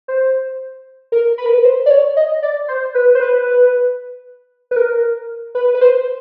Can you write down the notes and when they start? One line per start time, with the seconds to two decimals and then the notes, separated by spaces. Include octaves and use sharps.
0.08 C5
1.12 A#4
1.38 B4
1.46 A#4
1.54 B4
1.65 C5
1.86 D5
1.90 C#5
2.17 D#5
2.42 D5
2.68 C5
2.94 B4
3.15 C5
3.20 B4
4.71 B4
4.76 A#4
5.55 B4
5.75 B4
5.81 C5